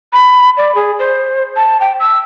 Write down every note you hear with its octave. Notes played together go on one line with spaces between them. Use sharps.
B5
D5
G#4
C5
A5
G5
E6